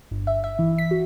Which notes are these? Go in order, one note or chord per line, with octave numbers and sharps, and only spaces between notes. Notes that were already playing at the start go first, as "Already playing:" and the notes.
G1
E5
E5
E3
B6
F#4